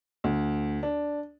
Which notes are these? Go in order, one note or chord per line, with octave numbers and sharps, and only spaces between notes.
D2
D4